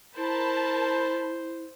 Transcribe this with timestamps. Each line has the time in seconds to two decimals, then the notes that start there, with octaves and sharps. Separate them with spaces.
0.16 E4 A#4 C5 A5 B5